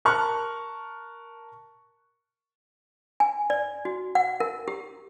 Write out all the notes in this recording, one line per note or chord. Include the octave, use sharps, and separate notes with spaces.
A#4 A5 C#6 F6 F#6
G#5
D5
F#4
F#5
A#4
G4